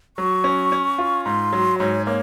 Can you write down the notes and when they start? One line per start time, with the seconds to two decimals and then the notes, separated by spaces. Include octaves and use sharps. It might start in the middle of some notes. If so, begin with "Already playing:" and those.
0.17 F#3 C#6
0.44 C#4
0.72 C#4
0.98 F4
1.25 G#2 C6
1.53 F#3
1.79 G#2 C#5
2.06 A#3 C#5